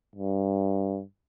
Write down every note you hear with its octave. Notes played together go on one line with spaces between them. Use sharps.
G2